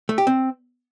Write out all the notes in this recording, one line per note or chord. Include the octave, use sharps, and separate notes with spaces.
A3
G4
C4